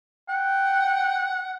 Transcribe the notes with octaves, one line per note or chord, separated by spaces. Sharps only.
F#5 G5